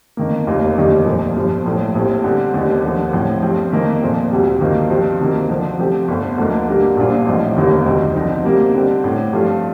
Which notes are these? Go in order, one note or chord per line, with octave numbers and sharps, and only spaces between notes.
F2 D#3 A#3
F1 D#2 D#3 A#3 F4
F1 D#2 D#3 G3 D4
A#1 A#2 F3 A3
G1 G2 F3
A#1 A2 F3 A3
A#1 A2 G3 C4
D3 G3 C4
D#2 D3 A3 D#4 G4
D#2 D3 F3
A2 F3 C4
G2 F3 C4
F2 D#3 A#3
A#2 F3 A3 C4
D2 C3 G3
G2 D#3 A#3 F4 C5
G2 F3 C4 F4
D2 C3 D#3 A#3
D3 F3 C4
C3 F3 A3 C4 G4
G1 F2 D3 A3 C4
D2 D3 F3 A#3 D#4
G2 D3 G3 A#3 D4
A#1 A#2 G3 D4 F4
A1 A2 F3 C4 D#4
F1 D#2 D#3 G3 A#3
D2 C3 D#3 G3 C4
D3 F3 C4 D#4
C3 G3 A#3 D#4
D3 G3 C4
A2 A3 D4
G2 F3 A3 C4 F4